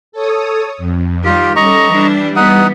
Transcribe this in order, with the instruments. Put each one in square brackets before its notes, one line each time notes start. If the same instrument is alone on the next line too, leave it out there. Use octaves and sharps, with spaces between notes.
[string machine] A4 C#5 D#6
F2
[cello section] D#3 G3 G4 [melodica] F4
[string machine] G3 A4 [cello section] C#4 [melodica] D#5 A#5 C#6
[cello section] E3 D4 E4 [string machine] G3
[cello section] E3 B3 [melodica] D#4 F#5 D#6